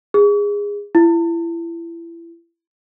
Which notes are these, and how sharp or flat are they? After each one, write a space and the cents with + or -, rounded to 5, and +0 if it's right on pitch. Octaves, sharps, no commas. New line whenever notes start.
G#4 -20
E4 +30